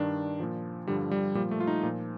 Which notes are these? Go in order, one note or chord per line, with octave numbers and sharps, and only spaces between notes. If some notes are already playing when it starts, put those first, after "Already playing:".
Already playing: G2 D#3 D4
A#2 F3
G2 D3 F3 G3
G3
A#2 F3 G3
A3
F4
D#4
A#2 F3